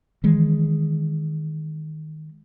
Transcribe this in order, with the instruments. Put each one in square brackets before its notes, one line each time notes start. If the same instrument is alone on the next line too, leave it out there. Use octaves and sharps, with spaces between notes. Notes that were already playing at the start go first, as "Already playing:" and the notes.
[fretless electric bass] D#3 E3 G#3